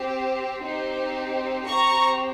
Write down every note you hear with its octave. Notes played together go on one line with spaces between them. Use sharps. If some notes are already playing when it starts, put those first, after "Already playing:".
Already playing: C4 G4
C4 D#4 G4
C4 G4 A#5 C#6